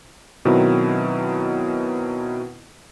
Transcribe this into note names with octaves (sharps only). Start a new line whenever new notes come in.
B2 D#3 F#3 C4 E4